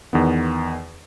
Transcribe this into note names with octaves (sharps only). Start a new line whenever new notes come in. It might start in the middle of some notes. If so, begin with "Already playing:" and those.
E2 D#3 B3